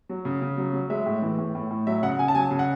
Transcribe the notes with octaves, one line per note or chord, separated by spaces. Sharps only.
F#3
C#3
C#3
F#3
F#3
G#3 E5
A2
E3
A2
A2
A2
F#3 E5
C#3 F#5
C#3 G#5
A5
F#3 G#5
C#3
F#5